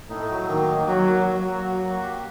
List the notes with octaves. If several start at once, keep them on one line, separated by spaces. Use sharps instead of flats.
A2 D#4
F#3
D#3 A#3
A#3
F#3 F#4
A#3
F#3 F#4
A#3
F#4
A#3
G4